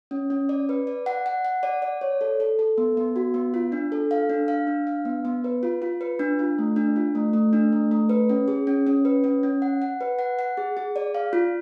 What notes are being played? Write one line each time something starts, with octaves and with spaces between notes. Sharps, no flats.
C#4
C#4
D5
B4
D5
F#5
F#5
F#5
D5
D5
C#5
A4
A4
A4
B3
B3
F#4
B3
F4
D4
A4
F5
D4
F5
D4
F5
B3
B3
B4
F4
F4
B4
D4
F4
A3
D4
F4
A3
A3
D4
A3
A3
B4
C#4
G#4
C#4
C#4
B4
C#4
C#4
F#5
F#5
B4
F#5
F#5
G#4
G#4
D5
F5
F4